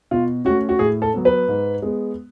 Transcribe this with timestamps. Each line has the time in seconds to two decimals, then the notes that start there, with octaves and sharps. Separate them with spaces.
0.11 B2 F4
0.45 A3 C#4 F#4
0.69 F#4
0.79 A2 G#4
1.02 A4
1.14 F#3 B3
1.25 B4
1.48 G#2
1.82 G#3 B3